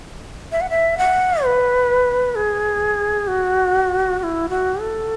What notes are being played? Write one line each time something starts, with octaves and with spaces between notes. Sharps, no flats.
E5
F#5
E5
F#5
B4
G#4
F#4
F#4
E4
F#4
A4